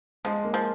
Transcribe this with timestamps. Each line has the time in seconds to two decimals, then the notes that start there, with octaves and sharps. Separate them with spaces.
0.25 F3 G#3
0.44 A#3
0.54 F3